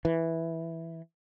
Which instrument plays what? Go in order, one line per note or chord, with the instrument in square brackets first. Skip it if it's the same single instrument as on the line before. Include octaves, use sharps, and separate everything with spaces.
[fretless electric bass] E3